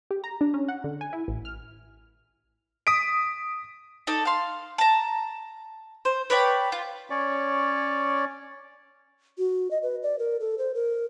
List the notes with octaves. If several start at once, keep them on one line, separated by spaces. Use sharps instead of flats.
G4
A#5
D4
C#4
F#5
D3
G#5
E4
A1
F6
D#6 B6 D7
D#4 A4 D5
F5 C6
A5 A#5
C5
B4 C#5 D5 G5
F4
C#4 C#5 D5
F#4
D#5
B4
D5
A#4
A4
C5
A#4